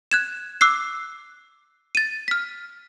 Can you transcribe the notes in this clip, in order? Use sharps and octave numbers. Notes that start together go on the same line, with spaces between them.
F#6 G#6 E7
D6 E6 F#6 C7
A6 D#7
F6 B6